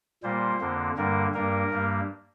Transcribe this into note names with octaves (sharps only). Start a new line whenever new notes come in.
A#2 G3 A#3 C5
F2 D3 A#3
G2 D3 G3 A#3 A#4
G2 G3 A#3 A#4
G2 G3 A#3